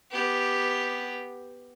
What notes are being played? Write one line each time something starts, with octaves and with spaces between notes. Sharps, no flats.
B3 G4